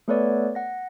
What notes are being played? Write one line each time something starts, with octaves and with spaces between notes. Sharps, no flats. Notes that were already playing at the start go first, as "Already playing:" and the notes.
A3 B3 A4 B4 C#5 D5
F#5 A#6